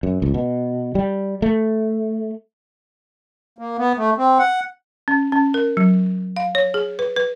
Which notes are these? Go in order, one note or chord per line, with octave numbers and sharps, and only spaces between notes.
F#2
C#2
B2
G3
A3
A#3
B3
A3
C4
F#5
C#4
C#4
A#4
F#3
F5
C#5
G#4
B4
B4